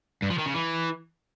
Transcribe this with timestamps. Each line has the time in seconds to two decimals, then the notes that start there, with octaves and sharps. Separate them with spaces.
0.22 G2
0.30 F3
0.38 D#3
0.46 C#3
0.54 E3